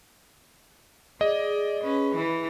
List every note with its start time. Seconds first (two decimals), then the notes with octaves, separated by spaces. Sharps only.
1.21 G#4 D5 D#5
1.84 C#4 B4
2.16 E3